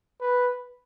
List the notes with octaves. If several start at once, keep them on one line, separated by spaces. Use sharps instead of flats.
B4